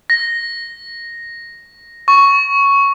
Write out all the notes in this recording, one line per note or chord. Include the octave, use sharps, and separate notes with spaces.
A#6
C#6